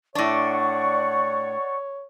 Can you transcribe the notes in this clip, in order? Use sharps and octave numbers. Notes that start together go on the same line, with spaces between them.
A2 D4 C#5 D5 F#5 C#6